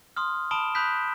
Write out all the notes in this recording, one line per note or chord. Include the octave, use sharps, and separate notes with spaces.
C6 D#6 F6
A5 B5 D#6 D7 E7 G7
B5 D#6 F#6 G6 B6